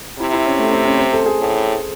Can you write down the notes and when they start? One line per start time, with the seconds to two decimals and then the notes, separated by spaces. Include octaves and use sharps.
0.19 C3 E4
0.33 E4
0.46 C#4
0.59 A3
0.72 C4
0.85 C#4
0.99 C5
1.13 A4
1.26 G#4
1.39 A2